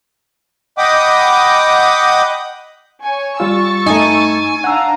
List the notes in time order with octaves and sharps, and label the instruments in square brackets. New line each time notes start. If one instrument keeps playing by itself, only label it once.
[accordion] D#5 F#5 G5 B5 D6 D#6
[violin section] C#5 G#5 C#6
[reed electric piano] G3 F4 [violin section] C#6 E6 A6
[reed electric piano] G2 A3 [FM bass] D#4 [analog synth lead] G#5
[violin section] D4 F5 A#5 [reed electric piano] F#5 E6